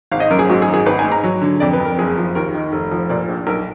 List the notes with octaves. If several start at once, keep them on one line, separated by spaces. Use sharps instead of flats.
G#1 F5
D#5
F#2 A#4
G#4
G#2 F#4
G#4
G#1
G#4
G#1 B4
G#5
G#2
A#5
F#3
D3
F2 D5
B4
F2
A#4
F#1 G#4
F3
D#2 A#4
D#3
F1
F3
A#2 D5
A#1
B1 A#4